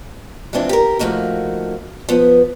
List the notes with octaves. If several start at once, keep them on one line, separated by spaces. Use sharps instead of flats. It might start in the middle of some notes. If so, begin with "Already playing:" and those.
E3 F3 G#3 C4 D4 E4
G4 A#4
F3 A3 A#3 D#4 F#4
F3 B3